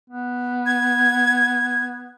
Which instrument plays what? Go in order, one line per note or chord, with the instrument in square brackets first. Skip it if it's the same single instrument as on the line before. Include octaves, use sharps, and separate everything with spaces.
[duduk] B3
[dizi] G#6